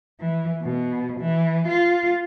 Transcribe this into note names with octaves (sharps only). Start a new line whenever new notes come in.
E3
B2
E3
F4